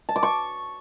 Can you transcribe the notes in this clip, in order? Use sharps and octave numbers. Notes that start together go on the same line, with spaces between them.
A5
D6
C#6